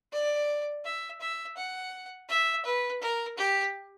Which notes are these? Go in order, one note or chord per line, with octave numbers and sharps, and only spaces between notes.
D5
E5
E5
F#5
E5
B4
A#4
G4